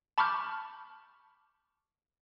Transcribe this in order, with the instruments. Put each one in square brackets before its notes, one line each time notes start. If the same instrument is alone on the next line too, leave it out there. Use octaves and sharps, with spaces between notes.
[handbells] A5 B5 C#6 D6 F6 G6